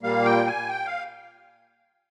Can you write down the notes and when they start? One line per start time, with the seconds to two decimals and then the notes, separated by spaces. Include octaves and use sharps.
0.02 A#2 G3 A#3 F5
0.25 G5
0.47 G#5
0.69 G5
0.86 F5